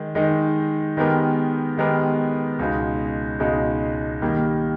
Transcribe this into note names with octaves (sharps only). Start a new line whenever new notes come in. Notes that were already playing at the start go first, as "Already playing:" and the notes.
Already playing: D#3 G#3
D#3 G#3 D#4
D#3 G#3 B3 G4 A#4
D#3 G#3 B3 G4 A#4
C#2 B2 G#3 D#4
C#2 B2 G#3 D#4
D#3 G3 A#3